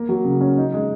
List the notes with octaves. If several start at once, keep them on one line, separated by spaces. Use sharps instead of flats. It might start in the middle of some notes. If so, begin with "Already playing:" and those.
Already playing: A#3 A#4
F#3
C#3
C#4
D#4
G#3